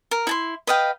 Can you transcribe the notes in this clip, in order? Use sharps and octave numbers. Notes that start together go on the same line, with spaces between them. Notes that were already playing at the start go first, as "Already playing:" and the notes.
A#4
E4 A5 C6
B4 D#5 F5 G5